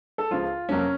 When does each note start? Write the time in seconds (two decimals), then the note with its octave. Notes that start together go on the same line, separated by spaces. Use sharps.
0.18 A4
0.31 C#2 C#3 F3 F4
0.69 F2 C3 F#3 A#3 C#4